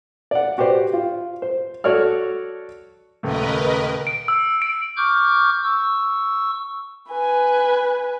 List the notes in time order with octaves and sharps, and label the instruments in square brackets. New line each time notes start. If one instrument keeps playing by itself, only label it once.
[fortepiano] D5 F#5
F#4 G4 B4 C5 D5
F4
C5
F#4 A4 C#5 D5 F6
[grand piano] D#1 C#2 A3 [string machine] A#4 B4 D#5
[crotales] D7
E6
D7
[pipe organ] C#6 D6 F6 G6
C#6 E6
[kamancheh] B4 G#5